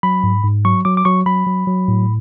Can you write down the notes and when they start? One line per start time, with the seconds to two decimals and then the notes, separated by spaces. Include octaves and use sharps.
0.03 F#3 B5
0.24 G#2
0.44 G#2
0.65 F#3 C#6
0.85 F#3 D6
0.97 D6
1.05 F#3 C#6
1.26 F#3 B5
1.47 F#3
1.67 F#3
1.88 A2